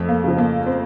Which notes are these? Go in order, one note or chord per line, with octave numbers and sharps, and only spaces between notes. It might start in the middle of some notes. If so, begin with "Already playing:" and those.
Already playing: F2 A3
A#3
C#3 F3
A#3
C4